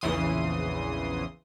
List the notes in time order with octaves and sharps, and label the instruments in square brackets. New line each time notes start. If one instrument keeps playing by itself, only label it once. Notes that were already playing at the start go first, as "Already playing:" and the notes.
[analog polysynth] A#1 E2 C#3 E3 C6 D#6